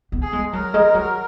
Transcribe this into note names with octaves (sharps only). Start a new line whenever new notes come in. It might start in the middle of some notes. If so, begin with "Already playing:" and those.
B3
G#4
G#3
F#3 A#4
G#3
F#3